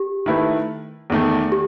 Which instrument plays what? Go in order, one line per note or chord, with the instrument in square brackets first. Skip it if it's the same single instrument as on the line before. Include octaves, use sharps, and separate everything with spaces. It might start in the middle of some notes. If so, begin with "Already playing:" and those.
Already playing: [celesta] G4
[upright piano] D#3 A3 E4 B4
E2 D#3 A3
[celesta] G4